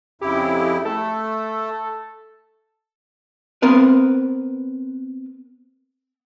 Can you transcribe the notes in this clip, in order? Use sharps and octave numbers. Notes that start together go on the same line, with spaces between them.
F2 C#3 E4 G4
A3 A4
B3 C4 A#4 B4